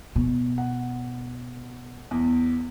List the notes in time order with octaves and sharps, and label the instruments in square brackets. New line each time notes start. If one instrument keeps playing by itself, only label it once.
[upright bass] B2
[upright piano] F#5
E2